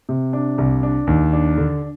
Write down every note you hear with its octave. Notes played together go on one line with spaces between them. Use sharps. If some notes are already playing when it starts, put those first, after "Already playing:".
C3
D4
C2
D4
D#2
D4
D3